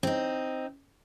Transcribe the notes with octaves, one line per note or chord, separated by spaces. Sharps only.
C4 D#4